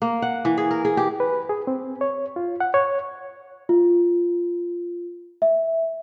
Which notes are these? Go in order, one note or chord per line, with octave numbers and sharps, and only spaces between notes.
A#3
F#5
E3
G#4
A#4
G#4
G4
B4
G#4
C4
C#5
F4
F#5
C#5
F4
E5